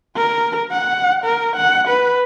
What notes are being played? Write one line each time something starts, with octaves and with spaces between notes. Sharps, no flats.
A#4
F#5
A#4
F#5
B4